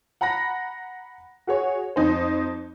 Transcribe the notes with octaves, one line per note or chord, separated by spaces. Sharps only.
F#5 A#5 B5 F#6 A#6
F#4 G#4 C#5
F2 D#4 C5